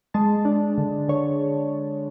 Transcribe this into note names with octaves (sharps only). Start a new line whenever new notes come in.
G#3 A5
D4
D3
D3 C#5